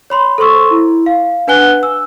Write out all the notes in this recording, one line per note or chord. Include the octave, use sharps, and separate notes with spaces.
C#5 B5 C6
A4 C5 C6 C#6 E6
E4
F5
D4 B4 F#5 G#5 F#6 G7
E6